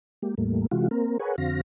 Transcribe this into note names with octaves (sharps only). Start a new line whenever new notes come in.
G#3 A#3 G4
E2 A2 G3 A3 A#3
C3 E3 G#3 F4 F#4
A#3 C4 A#4
G#4 A#4 B4 C#5 F#5 G#5
F2 D3 C4 F#4 F5 A#6